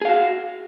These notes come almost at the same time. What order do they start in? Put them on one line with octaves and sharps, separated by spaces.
G#4 F5 F#4